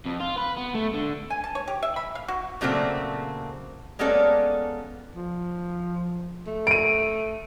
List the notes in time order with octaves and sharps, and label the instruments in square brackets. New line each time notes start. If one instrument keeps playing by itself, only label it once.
[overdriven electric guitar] F2
F4
B4
B3
A3
D3
[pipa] G#5
A5
C#5
G4
E5
B5
F5
F#4
[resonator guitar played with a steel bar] A#2 C#3 F#3 A3 A#3 C4
G#3 A#3 B3 C#4 A4 D5
[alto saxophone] F3
A3
[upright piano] D7 D#7